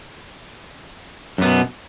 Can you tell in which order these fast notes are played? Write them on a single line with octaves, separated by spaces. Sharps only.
F#2 B3 B2